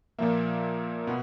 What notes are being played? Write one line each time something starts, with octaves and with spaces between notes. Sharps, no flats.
A#2 F3 A#3 E5
B2 B3